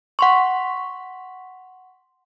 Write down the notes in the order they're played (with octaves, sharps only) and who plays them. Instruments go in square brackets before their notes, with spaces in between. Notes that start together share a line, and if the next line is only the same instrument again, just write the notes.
[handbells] F#5 C6 C#6